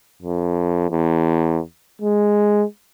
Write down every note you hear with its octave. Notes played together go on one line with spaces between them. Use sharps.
F2
E2
G#3